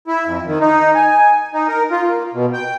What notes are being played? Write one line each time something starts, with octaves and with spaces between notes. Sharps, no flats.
E4
F2
D#3
D#4
G#5
D#4
A#4
F4
A#3
B2
G5